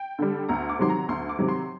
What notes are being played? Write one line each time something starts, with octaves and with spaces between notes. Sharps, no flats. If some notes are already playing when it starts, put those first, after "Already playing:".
Already playing: G5
D3 G3
D2 A#5
D6
C3 D#3 F#3 C6
A#5
D2 C6
D6
C3 D#3 F#3
C6